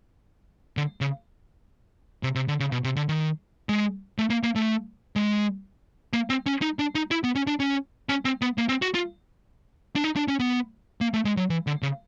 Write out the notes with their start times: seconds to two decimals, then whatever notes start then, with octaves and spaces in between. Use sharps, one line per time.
0.77 D3
1.01 C#3
2.23 C3
2.35 C3
2.48 D3
2.60 C#3
2.72 B2
2.84 C3
2.96 D3
3.09 D#3
3.69 G#3
4.18 A3
4.30 A#3
4.43 A#3
4.56 A3
5.16 G#3
6.13 A#3
6.30 C4
6.47 C#4
6.62 D#4
6.79 D4
6.95 D#4
7.11 E4
7.24 B3
7.35 C#4
7.47 D4
7.60 C#4
8.09 C#4
8.25 C4
8.42 B3
8.58 A#3
8.69 C4
8.82 F#4
8.94 F4
9.96 D4
10.04 D#4
10.16 D4
10.28 C#4
10.40 B3
11.01 A#3
11.14 A3
11.25 G#3
11.37 F#3
11.50 E3
11.67 D3
11.82 C#3